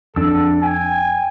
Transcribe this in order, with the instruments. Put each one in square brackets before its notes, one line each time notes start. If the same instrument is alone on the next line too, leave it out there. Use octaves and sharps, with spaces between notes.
[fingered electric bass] F2 [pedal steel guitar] D4 E6 [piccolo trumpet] A4
[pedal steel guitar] G5 [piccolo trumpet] G#5